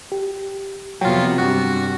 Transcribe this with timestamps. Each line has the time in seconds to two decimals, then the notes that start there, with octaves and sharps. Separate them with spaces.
0.12 G4
1.01 F2 C3 F#3 B3 F4 G5
1.38 G2 G3 F#4